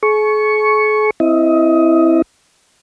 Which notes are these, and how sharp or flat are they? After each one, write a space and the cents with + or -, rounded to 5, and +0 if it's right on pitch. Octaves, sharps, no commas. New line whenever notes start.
G#4 +45 C#6 +0
C4 +0 E4 +0 D#5 +20